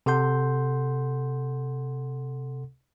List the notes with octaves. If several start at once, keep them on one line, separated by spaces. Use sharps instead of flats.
C3 A4 F#5 C6 G6